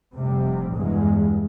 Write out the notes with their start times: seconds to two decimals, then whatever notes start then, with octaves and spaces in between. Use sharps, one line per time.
0.15 F1 C3 G3
0.74 E2 G2 G#3